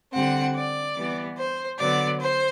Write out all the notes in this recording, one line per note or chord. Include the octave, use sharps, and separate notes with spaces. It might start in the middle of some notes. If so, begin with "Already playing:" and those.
D3 G3 C4 F#5
D5
E3 G3 B3
C5
D3 F#3 B3 D5
C5